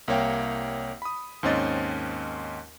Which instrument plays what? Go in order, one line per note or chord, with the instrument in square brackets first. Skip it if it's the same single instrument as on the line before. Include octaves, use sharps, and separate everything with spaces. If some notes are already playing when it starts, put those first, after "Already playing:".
[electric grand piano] C2 A#3 C#5 F5 G5
B5 D#6
D#2 G#2 C4 C#4 D#5 A6